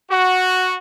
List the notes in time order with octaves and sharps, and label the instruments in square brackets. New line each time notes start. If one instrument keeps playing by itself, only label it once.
[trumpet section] F#4